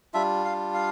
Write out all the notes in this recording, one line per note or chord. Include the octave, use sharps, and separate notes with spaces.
G3 D4 F4 E5
F5
F5